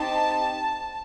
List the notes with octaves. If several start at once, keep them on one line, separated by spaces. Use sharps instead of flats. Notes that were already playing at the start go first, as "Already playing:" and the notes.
Already playing: C4 D#4 G4 A5